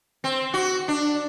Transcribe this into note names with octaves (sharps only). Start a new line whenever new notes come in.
C4
F#4
D4